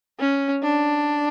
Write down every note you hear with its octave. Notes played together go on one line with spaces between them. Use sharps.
C#4
D4